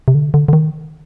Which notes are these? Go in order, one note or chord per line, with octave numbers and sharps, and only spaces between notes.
C3
D3
D3
D3
D#3